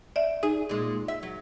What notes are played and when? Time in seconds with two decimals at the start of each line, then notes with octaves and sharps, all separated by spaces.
0.16 D5 E5
0.43 D#4 G#4
0.69 A#2 G#3
1.08 E5
1.23 F#3